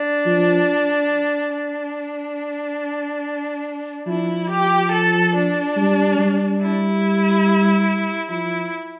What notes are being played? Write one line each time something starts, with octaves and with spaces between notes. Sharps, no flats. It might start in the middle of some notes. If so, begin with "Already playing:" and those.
Already playing: D4
F3
D4
F3 E4
G4
A4
D4
G3
G3
E4
F3 E4